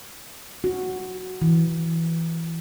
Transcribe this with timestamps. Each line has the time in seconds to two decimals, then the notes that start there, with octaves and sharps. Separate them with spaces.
0.64 F#4
1.42 E3